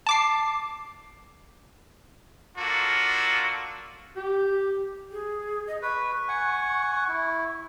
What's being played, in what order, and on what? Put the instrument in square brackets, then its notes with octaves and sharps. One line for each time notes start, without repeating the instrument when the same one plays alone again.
[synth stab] A5 D6 C7
[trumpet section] A#3 D4 F4 F#4 A4
[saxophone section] G4
[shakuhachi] G#4
D#5
[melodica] B4 [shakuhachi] C#6
[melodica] F#5 G#5
E4